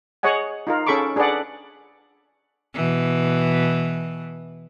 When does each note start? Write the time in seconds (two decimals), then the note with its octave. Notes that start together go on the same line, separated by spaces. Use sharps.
0.23 G#4 C#5 D#5 F#5 G#5
0.67 D#4 F4 A#4
0.87 C#4 G#4 A4 B5 C#6 D6
1.16 D4 G#4 A4 B4 D5 F#5
2.74 B2 E3